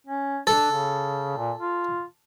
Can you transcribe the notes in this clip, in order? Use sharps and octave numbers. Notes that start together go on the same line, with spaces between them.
C#4
D4 A4
C#3
A#2
F4